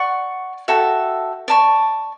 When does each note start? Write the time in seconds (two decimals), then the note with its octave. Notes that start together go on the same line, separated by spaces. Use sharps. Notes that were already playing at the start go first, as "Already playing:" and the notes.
Already playing: D5 F#5 C#6
0.68 F#4 A4 E5 G5
1.48 D5 A5 C#6